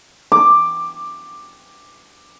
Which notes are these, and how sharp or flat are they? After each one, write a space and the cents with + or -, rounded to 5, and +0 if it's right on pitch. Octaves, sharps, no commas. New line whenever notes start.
D6 +10